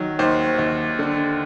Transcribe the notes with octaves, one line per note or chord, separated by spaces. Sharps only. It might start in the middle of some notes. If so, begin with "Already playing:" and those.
Already playing: D#3 F#3
D#2 C5
D#2
D3